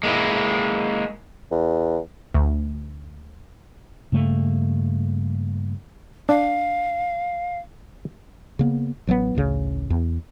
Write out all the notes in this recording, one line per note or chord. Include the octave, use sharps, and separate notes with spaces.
G#3 A#3 D#4 E4
E2
D2
G2 C#3 A3 A#3
D4 F5
C#3 A#3 B3
A1 F#3 G#3 B3
A1 D2 C#3
E2